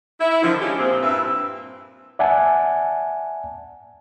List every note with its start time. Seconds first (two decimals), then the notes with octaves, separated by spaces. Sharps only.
0.21 E4
0.43 D3 D#3 F3
0.62 G#3 C#4 D#4 F4 G4
0.78 A#2 F3 C4
1.03 G2 A#2 C4 E4 B4 E5
2.19 D5 E5 F#5 G#5 A5